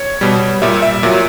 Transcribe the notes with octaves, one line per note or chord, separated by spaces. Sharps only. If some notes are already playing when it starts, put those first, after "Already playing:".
Already playing: C#5
B2 G3
A#2 G3 E5
E5
A#2 F#3